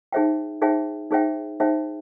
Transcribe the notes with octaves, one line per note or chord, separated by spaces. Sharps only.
D#4 G#4 C5 E5 G5
D#4 G#4 C5 E5 G5
D#4 G#4 C5 E5 G5
D#4 G#4 C5 E5 G5